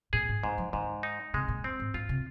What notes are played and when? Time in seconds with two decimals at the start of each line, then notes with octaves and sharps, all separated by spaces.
0.13 A#2 G#4
0.29 G#2
0.43 G#2 D#3
0.58 F3
0.73 G#2 D#3
1.03 D#4
1.34 C3 G#3
1.48 A#2
1.64 F2 C4
1.80 G#2
1.94 G#2 F4
2.09 C3